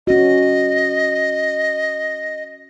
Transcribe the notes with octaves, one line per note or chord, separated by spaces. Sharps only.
C#4 F#4 D#5